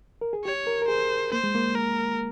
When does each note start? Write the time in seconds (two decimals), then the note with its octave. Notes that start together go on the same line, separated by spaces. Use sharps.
0.21 A#4
0.33 G#4
0.45 G4 C#5
0.67 A#4
0.82 A#4
0.88 G#4 C5
1.33 A#3 C5
1.44 G#3
1.55 A#3
1.75 A#4